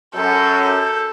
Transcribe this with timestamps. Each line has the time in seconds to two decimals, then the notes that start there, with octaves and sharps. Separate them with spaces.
0.14 F#2 A4 G6